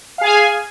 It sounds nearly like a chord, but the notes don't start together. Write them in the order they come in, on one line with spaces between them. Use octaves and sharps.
F5 G#4 G#5